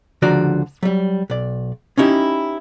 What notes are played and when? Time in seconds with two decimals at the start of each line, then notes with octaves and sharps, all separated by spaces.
0.22 C#2 D3 F3 F#4 D5 A#5
0.83 F#3 G3
1.30 B1 D5
1.97 C#4 D#4 E4 G4